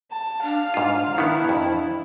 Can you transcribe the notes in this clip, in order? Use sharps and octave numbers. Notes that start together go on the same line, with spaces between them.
A5
D4 F5
G#2 F4
D#3 B3 E4
F2